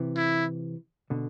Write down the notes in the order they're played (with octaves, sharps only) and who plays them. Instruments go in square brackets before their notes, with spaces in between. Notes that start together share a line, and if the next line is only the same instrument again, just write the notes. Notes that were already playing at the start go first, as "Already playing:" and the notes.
Already playing: [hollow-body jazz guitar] C3 E3
[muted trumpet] E4
[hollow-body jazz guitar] B2 D3